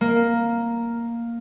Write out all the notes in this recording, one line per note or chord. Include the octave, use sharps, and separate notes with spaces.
A#3